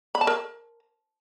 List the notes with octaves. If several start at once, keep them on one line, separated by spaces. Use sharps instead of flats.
B5
A5
A#4